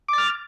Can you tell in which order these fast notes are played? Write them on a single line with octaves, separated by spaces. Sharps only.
D6 A6 F6